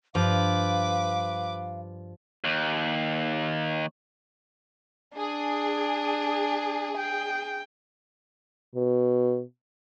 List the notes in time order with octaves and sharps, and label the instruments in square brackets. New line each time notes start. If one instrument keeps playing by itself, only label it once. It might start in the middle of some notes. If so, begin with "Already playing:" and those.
[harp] G2 [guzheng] F3 [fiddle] B4 D6 [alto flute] F5
[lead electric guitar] D#2
[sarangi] D4 [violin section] G#4
[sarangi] G5
[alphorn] B2